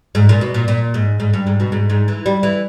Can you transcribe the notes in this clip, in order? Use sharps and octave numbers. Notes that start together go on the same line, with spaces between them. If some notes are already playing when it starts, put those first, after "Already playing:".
G#2
A#2
B2
A#2
A#2
G#2
G#2
G2
G#2
B2
G#2
G#2
E3
G3
E3